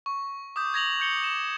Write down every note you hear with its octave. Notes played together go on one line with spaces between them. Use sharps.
C#6
D6 D#6 G6
G#6 A#6 F7 F#7
G6 C#7 G7
E7